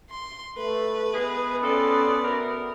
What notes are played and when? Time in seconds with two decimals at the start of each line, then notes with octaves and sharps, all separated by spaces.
0.11 C6
0.57 A3 B4
1.13 G#3 B3 E4 G#4
1.63 C4 C#4 F4 A4 D5
2.25 B2 A3 A#4